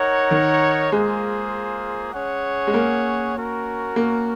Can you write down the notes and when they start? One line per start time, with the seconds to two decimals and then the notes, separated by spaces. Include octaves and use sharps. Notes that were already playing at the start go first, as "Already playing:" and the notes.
Already playing: D#4 A#4 C#5 F#5
0.31 D#3
0.92 G#3 A#3 F4 G#4 C5
2.13 C#4 G#4 C#5 F#5
2.67 G#3
2.74 A#3
3.36 C#4 F#4 A#4
3.96 A#3